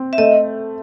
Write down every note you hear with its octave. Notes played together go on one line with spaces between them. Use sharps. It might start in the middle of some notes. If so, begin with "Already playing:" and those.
Already playing: C4
E5
A3 D#5